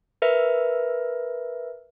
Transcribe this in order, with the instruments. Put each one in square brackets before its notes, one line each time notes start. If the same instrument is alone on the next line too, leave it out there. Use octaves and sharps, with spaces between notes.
[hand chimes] A#4 B4 E5